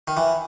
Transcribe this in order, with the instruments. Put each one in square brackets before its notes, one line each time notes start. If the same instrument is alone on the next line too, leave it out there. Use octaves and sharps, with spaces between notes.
[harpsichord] D#3
E3